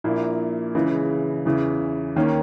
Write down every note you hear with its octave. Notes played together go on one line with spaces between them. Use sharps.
A#1 A#2 A#3 E4
C#2 C#3 E3 G#3
E2 C#3 E3
D#2 D#3 A#3 C#4